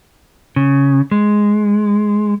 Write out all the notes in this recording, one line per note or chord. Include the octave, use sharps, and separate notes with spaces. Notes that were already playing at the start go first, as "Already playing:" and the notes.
C#3
G#3